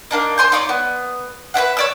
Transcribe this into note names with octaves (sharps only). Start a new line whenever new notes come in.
A#3 D4 D#4
C5 G#5 C6 G6
D#4 F4 C#5 D5
B3
B4 C5 E5 F#5
C#5 D5 E6